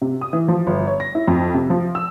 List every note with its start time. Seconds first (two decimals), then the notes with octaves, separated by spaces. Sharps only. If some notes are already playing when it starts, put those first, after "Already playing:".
0.02 C3
0.21 D#6
0.33 E3
0.48 F3
0.67 G1
0.87 C#5
1.00 A#6
1.15 E4
1.27 F2
1.54 C3
1.70 F3
1.95 E6